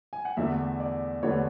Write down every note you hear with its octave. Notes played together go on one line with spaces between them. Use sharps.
G#5
F#5
E2 D3 A3 E5
D5
E2 D3 A3 C#5
B4